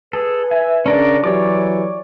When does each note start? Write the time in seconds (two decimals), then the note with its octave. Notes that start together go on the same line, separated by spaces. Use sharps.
0.13 G#4 A4 B4
0.51 E5 G#5
0.86 C#3 C#4 D4 A#4 D5
1.24 E3 F#3 G4 C#5 D5 D6